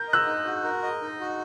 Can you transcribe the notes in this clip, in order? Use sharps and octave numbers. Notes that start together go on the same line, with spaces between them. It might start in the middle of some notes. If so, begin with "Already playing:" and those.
Already playing: A#4 G6
D#5
E6 F#6
D#4
F#4
A#4
D#5
D#4
F#4